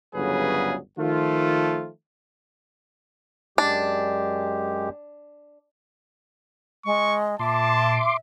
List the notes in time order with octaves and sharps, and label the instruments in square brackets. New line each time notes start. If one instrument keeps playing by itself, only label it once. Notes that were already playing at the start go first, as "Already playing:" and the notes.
[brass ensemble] G1 D2 C#3 F#3 G#4 B4
D#3 F3 A3 F4
[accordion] F#2 G#3 G4 [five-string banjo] D4
[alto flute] G#3 [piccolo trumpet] C#6
[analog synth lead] A#2 [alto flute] E5 [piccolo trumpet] A5 [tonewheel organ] C6 D6